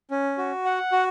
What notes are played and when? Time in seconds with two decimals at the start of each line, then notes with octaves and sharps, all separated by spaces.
0.11 C#4
0.38 F#4
0.65 F#5
0.92 F#4